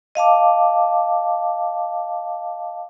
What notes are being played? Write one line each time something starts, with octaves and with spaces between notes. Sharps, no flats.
D#5 F5 A5 D6